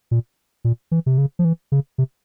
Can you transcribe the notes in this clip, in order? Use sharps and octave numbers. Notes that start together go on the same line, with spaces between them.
A#2
A#2
E3
C3
C#3
F3
E3
C#3
C3